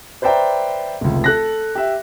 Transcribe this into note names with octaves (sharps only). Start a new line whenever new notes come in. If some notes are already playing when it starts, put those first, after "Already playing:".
B4 C5 D5 E5 G5 A#5
F1 C#2
A4 F#6 A#6
G4 E5